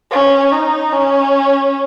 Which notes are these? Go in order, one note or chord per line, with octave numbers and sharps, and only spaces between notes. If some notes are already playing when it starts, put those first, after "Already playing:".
C#4
D#4
C#4